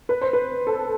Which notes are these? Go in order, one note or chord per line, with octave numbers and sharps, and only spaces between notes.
B4
C5
B4
A4